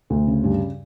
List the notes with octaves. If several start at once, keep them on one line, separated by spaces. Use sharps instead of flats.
D2
C#3
G2